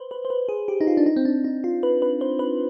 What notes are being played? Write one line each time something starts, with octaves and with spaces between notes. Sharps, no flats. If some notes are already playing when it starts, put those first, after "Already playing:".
Already playing: B4 C5
B4
C5
B4
G#4
G4
D#4
F4
D4
D#4
C4
D4
D#4
F4
B4
B4
C5
B4